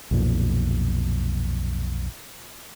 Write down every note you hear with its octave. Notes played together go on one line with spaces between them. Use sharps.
B1 F2 A#2